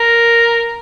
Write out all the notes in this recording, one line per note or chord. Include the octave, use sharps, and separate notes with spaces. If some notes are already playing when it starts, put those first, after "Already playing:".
Already playing: A#4